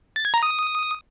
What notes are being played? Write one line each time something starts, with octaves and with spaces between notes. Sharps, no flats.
A6
G#6
A#5
D#6